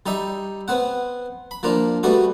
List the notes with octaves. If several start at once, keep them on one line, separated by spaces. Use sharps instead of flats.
G3 D#4 G4 E5
B3 C4 F#5
B5
F3 A#3 D4 F4
G3 A3 B3 F#4 D5